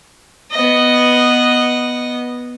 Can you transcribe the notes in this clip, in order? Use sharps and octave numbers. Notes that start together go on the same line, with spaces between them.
B3 D#5